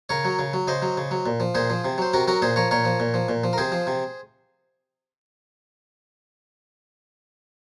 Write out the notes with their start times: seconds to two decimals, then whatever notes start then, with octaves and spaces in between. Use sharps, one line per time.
0.09 C#3 A#4 C#5
0.25 F#3
0.39 C#3
0.53 F#3
0.68 C#3 C5 D#5
0.82 F#3
0.98 C#3
1.11 F#3
1.26 A#2
1.40 F3
1.55 A#2 G#4 C5
1.70 F3
1.85 C3
1.98 F#3 C5
2.13 C3 F#4 A#4
2.28 F#3 F#4 A#4
2.42 A#2 G#4 C5
2.56 F3 A#4 C#5
2.71 A#2 A#4 C#5
2.85 F3
3.00 A#2
3.14 F3
3.29 A#2
3.44 F3
3.53 A#4
3.58 C3 G#4 C5
3.72 F3
3.87 C3